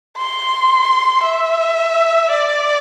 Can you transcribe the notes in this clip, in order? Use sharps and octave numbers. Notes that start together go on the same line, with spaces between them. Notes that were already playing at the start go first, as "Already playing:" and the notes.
C6
E5
D5